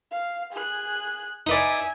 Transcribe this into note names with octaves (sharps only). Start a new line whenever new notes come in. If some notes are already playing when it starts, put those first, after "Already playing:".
F5
G#4 F#6
D#4 B4 D5 E5 G#5